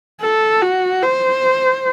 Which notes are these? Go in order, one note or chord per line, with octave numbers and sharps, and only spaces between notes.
A4
F#4
C5